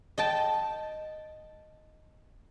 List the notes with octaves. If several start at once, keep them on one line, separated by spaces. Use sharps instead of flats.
D#5 G5 A5